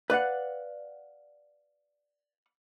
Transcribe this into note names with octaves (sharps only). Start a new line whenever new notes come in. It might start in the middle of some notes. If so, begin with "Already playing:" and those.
B4 D5 F5 F#5